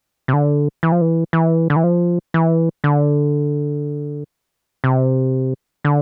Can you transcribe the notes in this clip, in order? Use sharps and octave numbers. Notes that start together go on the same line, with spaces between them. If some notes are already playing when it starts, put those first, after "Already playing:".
C3
D3
E3
F3
E3
E3
D3
E3
F3
E3
D3
C3
D3